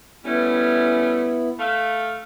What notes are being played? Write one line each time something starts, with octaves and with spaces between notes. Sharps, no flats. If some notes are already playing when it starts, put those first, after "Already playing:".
G3 A3 B3 C#4 E4
A3 F5